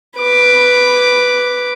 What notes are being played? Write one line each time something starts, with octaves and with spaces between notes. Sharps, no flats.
B4 D6